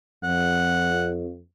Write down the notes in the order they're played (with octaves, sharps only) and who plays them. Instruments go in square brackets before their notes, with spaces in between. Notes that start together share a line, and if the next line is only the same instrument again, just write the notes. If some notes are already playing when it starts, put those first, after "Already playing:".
[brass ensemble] F2 [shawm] F#5